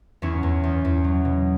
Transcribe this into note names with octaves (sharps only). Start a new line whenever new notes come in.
E2 C#4 E4
E2
E2
E2
F#3
B2